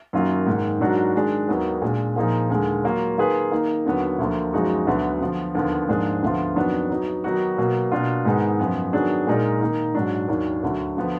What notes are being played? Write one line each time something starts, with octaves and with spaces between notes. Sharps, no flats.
F#2 D#3 F#3 A#3 F4
G#2 D#3 A#3
G#2 F#3 D4 F#4 A#4
D#3 G#3 D4
D#2 D#3 F#3 B3 D#4
A#2 G#3 D4
A#2 F3 A#3 D#4 G#4
D#2 D3 G#3
F#3 A#3 F4
D#3 A#3 F4 G#4 B4
D#3 A#3 D#4
D#2 D3 F#3 B3
D2 D3 F3 A#3
F#2 F3 G#3 D#4 F#4
D2 D3 F#3 B3
D3 F3 B3
D#2 D3 F3 B3
G#2 F3 A#3 D4 G#4
D2 D3 F3 B3 F4
F2 D#3 F#3 B3 D4
F#3 B3 D#4
D#3 F#3 B3 D#4 F#4
B2 F#3 A#3
B2 A#3 D4 F4
G#2 D#3 G#3 B3 D#4
F#2 F3 B3
D#3 F#3 B3 D4 G#4
A#2 G#3 D#4 A#4 D5
D#3 A#3 D#4
G#2 F#3 D4
D#2 D#3 F#3 D4
D2 D3 F#3
D3 F3 B3